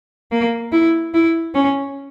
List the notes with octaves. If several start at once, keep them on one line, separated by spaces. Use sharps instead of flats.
A#3
E4
E4
C#4